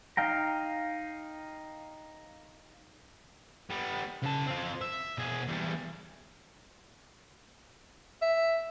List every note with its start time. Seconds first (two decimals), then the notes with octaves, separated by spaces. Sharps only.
0.17 D#4 F5 G5 A#5
3.70 G3 B3
4.22 C#3 A5
4.47 C4 F4
4.81 E5
5.18 B2 G#4
5.48 E2 G3
8.22 E5